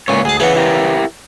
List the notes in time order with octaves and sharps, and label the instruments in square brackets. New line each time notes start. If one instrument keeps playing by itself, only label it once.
[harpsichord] C#2 A#2 [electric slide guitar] A3 C#4 C#5
[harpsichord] D2 A5 [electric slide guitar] G#4
[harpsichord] C#3 E3 B3 [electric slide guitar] G#4 F#5
[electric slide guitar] E4 G4 A#4